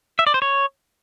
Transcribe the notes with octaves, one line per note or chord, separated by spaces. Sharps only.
E5
D5
C5
C#5